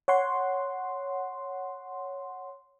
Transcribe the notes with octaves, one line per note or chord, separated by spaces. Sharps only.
C#5 F#5 C6